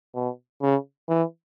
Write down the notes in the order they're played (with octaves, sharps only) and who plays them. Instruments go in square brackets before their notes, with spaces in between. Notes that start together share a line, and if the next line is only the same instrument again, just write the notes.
[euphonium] B2
C#3
E3